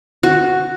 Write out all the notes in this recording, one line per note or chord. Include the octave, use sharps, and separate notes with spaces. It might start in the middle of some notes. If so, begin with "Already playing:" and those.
F#4